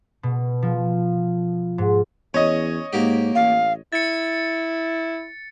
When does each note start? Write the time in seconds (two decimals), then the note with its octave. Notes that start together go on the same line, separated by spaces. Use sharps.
0.23 B2
0.62 F3
1.78 G#2
2.34 E2 C#4 C#5 D#5
2.93 G#2 A#3 F#4 G4
3.35 A1 F5
3.93 E4 A6 C#7